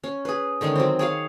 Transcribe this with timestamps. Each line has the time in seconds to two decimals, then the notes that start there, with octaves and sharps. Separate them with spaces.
0.04 C#4
0.25 G#4 B4
0.61 D3 D#3 G#3 C#4
0.75 F#3 C4
0.99 G#4 C#5 F5